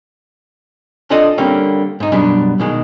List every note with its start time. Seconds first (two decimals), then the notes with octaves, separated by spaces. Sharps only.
1.10 D4 F4 A4 D5 D#5
1.38 D3 G3 A#3 C4 C#4
2.00 G#2 D#4
2.12 F#2 B2 G3 D4
2.60 B2 D#3 G#3